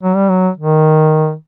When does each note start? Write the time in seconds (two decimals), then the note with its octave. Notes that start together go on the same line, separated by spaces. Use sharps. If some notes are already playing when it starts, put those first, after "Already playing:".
0.03 F#3
0.16 G3
0.29 F#3
0.57 D#3